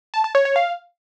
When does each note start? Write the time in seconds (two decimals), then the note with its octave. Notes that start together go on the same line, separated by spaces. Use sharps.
0.14 A5
0.24 A5
0.35 C#5
0.45 C#5
0.56 F5